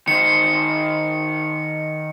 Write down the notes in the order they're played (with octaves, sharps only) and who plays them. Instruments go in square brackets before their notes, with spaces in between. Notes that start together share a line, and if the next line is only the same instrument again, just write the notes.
[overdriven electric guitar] D#3 C5 [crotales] C#7